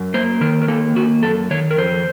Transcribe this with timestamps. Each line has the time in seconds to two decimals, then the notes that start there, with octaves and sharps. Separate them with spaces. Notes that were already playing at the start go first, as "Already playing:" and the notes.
Already playing: F#2
0.14 A#3 C5
0.41 D#3 A#4
0.62 A#4
0.68 A#3 A4
0.96 D#3 F#4
1.23 F#2 A4
1.51 D#3 C#5
1.71 A#4
1.78 F2 C5